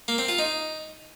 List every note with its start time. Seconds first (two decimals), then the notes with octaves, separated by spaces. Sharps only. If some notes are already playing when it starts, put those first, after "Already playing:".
0.08 A#3
0.18 C4
0.28 F4
0.39 D#4